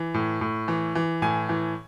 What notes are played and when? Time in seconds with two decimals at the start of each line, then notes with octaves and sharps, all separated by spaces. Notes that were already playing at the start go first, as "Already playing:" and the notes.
Already playing: E3
0.14 A2
0.41 A2
0.68 E3
0.95 E3
1.22 A2 G#5
1.49 E3